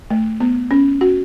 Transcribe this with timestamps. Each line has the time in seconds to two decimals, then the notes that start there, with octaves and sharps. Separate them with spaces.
0.10 A3
0.40 B3
0.71 C#4
1.01 F#4